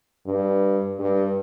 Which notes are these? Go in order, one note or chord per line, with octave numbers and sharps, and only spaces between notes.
G2
G2